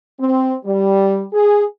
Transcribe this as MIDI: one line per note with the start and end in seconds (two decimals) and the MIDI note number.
0.20 0.55 60
0.66 1.25 55
1.33 1.63 68